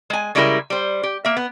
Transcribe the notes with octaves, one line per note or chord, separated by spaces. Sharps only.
G#3 G#5
C#3 G3 G#3 D4 E4 A#4
G3 C5
G4
A#3 E5
B3